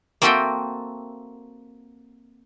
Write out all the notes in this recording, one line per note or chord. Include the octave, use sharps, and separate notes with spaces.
A#3 C4 F#4 A4 E5 G5